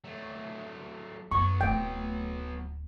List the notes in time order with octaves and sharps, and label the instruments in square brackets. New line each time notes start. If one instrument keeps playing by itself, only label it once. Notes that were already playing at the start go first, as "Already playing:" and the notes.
[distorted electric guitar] F#3 A3
[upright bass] F#2 [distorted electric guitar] F#3 B3 [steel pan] C#6
[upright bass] D1 A3 [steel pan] G5